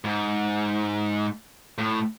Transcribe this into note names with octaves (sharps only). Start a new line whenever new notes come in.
G#2
A2